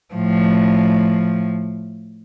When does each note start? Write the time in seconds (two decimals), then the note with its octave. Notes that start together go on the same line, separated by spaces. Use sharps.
0.14 A2 F3